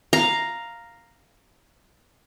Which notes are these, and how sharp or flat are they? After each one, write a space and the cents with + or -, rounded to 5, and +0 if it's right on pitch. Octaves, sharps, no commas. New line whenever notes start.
F5 +0 A#5 +0